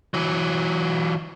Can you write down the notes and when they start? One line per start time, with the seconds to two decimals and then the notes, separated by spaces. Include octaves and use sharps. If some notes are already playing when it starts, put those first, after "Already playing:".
0.14 E3 F#3